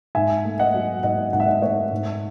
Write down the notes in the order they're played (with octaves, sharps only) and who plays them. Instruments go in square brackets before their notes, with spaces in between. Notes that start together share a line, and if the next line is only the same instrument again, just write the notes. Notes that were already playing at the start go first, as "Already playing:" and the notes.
[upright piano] G#2 E5 G#5
A3
D#5 F#5
F#3
G#2 D#5 F#5
G#2 F#5
E5
D#5 F#5
A3 C#5 E5
G#2